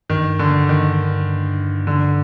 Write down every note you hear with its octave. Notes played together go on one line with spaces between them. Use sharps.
G2 D#3
D3
D#3
D3